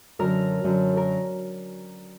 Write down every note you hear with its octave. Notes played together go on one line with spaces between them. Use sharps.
F#2 D3 A#4
F#2 D3
A#4